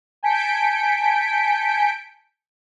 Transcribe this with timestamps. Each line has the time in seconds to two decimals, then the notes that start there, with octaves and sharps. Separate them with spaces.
0.23 G#5 A5 G6 B6 C#7 D7